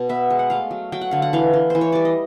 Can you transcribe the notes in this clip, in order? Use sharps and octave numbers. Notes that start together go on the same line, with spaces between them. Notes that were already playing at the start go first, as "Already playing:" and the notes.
Already playing: B2
B3 E5
G#3
F#5
A3 F5
F#3
F#3 G5
F#5
D3 F5
F#5
E3 F5
E3
E3 C5
C#5
G3 D5
D#5